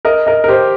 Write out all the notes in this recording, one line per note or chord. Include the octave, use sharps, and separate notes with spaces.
A#4 D#5
A#4 D#5
A#4
G4 C5